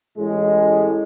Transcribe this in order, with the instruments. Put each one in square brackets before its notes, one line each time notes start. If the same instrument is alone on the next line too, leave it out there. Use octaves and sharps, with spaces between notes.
[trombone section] A1 A2 G#3